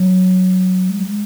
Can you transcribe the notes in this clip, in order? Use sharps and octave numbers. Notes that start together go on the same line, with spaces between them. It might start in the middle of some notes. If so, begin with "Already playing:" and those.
Already playing: F#3
G#3
F#3
G#3